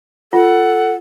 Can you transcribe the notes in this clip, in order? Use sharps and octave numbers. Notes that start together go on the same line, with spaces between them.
F4 A4 F#5